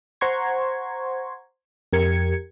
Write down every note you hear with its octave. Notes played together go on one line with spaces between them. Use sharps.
C5 F#5 A#5 C6 C#6 G#6
F2 G4 A#4 G#6 C#7